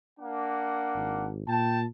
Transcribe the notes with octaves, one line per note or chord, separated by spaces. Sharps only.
A#3 D4 F#5
G#1
A#2 G5 A5